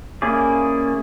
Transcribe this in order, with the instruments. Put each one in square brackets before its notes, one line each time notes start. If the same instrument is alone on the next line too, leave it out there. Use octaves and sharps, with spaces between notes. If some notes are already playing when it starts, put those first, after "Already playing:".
[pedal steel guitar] A#3 C#4 E4 G#4 D5